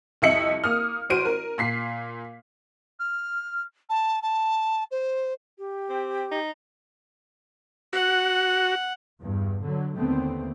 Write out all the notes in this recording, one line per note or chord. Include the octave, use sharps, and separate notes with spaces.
C2 F2 D#5 E5 C#7 F#7
A#3 D#6 F6
A1 F#4 C5 D7 D#7
A#4
A#2 B6 C7
F6
A5
A5
C5
G4
C4
D#4
F#4 F#5
E2 G2
D3 F#3
D#2 D3 A3 B3 C4